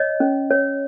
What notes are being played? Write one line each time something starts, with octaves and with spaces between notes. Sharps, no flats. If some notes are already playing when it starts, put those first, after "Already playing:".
Already playing: C#5 D#5
C#4
C#5